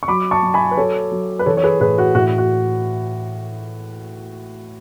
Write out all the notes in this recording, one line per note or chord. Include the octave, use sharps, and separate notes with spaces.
C#6
F#3 B5 D6
A5 C#6
F#3
G#5 B5
B4
F#3 A4 C#5
F#3
B4
E3 A4 C#5
C#5
G#4 B4
A2 G#4 B4
F#4
A2 F#4
F#4